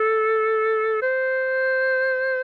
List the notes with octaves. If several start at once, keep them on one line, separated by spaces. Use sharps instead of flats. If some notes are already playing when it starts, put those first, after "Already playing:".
Already playing: A4
C5